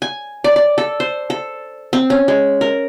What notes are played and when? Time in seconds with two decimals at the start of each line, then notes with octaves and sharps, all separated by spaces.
0.02 G#5
0.44 D5
0.56 D5
0.78 A4
1.00 C5
1.30 A4
1.93 C4
2.10 C#4
2.28 G#3
2.61 A#4